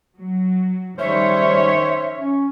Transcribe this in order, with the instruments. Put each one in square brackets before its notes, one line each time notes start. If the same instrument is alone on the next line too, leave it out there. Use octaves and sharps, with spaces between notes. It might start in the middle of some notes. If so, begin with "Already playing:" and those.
[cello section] F#3
[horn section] G#2 C#4 C5 [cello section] D#3 C#5 [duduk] G3 [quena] E5
[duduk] C#4